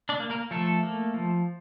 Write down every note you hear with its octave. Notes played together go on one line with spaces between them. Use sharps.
D4 D5
A#3
A#3 A#4
F3 A3 A4
A#3
F3